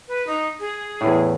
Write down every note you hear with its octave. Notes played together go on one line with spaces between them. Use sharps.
B4
D#4
G#4
E2 A2